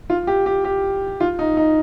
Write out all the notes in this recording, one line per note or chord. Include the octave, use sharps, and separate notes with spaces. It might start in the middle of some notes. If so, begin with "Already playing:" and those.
F4
G4
G4
G4
F4
D#4
D#4